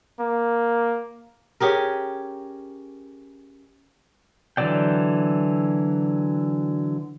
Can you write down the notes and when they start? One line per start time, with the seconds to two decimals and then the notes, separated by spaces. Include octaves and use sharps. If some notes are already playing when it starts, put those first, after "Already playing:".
0.20 A#3
1.60 C#4 G4 G#4 A#4
4.57 D3 E3 F#3 D5 G5